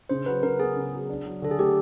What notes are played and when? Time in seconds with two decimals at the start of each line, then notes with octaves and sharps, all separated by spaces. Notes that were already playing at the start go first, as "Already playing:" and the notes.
0.09 C#3 C5
0.26 F#3 B4
0.43 C#3 A#4
0.60 B3 G#4
0.76 C#3
0.93 F#3
1.09 D4
1.26 F#3
1.42 D3 A4
1.51 G#4
1.59 A3 G4